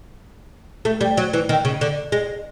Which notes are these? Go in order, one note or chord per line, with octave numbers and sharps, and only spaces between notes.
A3
G3
F#3
E3
D#3
C#3
D3
G#3